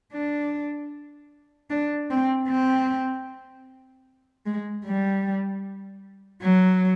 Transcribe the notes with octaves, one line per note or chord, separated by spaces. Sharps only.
D4
D4
C4
C4
G#3
G3
F#3